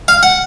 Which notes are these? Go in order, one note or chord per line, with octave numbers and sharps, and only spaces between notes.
F5
F#5